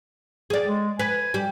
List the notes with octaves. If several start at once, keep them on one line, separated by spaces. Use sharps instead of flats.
G#4 D5
G#3
B4 G#5
G3